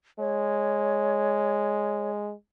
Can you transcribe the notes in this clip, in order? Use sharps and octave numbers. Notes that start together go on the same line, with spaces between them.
G#3 C#5